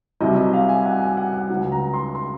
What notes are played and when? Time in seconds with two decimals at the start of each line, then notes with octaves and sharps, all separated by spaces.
0.21 C2 C3 F#3 D#5
0.36 D#5
0.54 F5
0.69 G#5
0.85 F#5
1.02 G#5
1.17 F#5
1.33 F#5
1.50 C#2 C#3 F#3
1.72 A#5
1.94 C6
2.15 C6